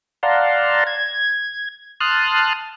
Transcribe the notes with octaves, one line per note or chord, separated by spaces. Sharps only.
D5 F5 F#5 A5 A#5 C6
G#6
A5 C6 D#6 F6 F#6